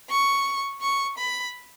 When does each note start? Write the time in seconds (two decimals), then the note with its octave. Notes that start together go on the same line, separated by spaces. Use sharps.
0.10 C#6
0.82 C#6
1.18 B5